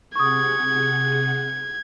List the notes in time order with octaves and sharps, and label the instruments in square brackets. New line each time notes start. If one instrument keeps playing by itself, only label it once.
[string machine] C3 G#4 F#5 [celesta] C#6 D#6 [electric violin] G#6